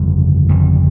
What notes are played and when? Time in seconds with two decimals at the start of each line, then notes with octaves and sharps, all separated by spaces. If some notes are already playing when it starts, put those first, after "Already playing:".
Already playing: G1 F2 C#3 G3
0.49 G1 F2 C#3 G3